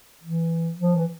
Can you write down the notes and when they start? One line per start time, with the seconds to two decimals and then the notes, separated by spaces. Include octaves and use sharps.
0.23 E3
0.77 F3
0.96 E3